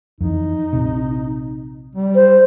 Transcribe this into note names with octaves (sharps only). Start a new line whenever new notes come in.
F2 E3 D#4
A#1 C3
G3
C5